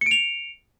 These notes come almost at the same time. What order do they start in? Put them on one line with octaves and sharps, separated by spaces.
C#7 D7 F7